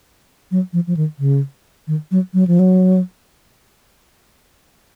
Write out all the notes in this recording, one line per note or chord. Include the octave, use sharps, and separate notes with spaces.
F#3
F3
F3
D#3
C#3
D#3
F#3
F#3
F3
F#3